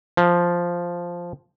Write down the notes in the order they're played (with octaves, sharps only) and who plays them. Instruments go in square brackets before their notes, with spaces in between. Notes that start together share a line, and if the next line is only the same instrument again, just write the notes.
[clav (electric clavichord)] F3